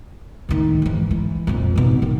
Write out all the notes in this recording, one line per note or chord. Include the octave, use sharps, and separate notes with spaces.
A2 D#3
G#2 E3
E3
F2 A#2
G#2 B2
D#3 B3